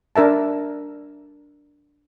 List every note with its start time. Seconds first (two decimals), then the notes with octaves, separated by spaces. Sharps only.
0.16 D4 A#4 E5 A5